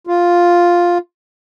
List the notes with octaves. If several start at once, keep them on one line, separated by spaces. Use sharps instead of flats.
F4